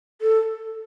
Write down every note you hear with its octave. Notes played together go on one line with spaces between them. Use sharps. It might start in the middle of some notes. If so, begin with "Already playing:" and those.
A4